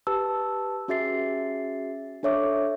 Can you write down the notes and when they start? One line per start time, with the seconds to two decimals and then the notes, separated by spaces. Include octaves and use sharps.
0.07 G4 B4 A5 E6
0.88 C#4 F#4 G#4 E5 A6 C7
2.23 D4 A4 C#5 E5 D6